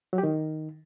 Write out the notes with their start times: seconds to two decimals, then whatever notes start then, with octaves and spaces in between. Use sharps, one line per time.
0.13 F#3
0.18 G4
0.23 D#3